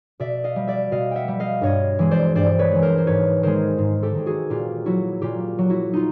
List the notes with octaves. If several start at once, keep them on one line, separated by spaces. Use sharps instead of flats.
B2 D5 E5
D#5 F5
G3
D5 E5
B2 D#5 F5
E5 F#5 G5
G3
D#5 F5
G2 C#5 D#5
E3 G#3
C5 D5
G2 C5 D5
B4 C#5
E3 G#3
A#4 C5
C5
G#2 B4 C#5
D#3 G#3 A#4 C5
G#2
G4 A4
D#3 G#3
F#4 G#4
A#2 F4 G4
F#3 E4 F#4
A#2 F4 G4
F#3
E4 F#4
D#4 F4